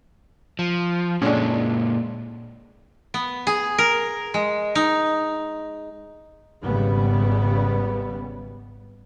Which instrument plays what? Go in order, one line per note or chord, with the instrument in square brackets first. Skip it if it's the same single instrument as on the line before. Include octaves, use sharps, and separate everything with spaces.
[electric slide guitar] F3
[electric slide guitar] A#2 G#3 [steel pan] C#4 D4
[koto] B3
G#4
A#4
G#3
D#4
[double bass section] G#1 C#3 G3 B3